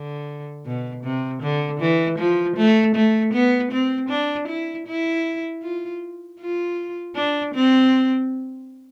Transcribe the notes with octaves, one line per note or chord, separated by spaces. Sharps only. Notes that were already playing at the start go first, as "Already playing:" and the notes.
Already playing: D3
B2
C3
D3
E3
F3
A3
A3
B3
C4
D4
E4
E4
F4
F4
D4
C4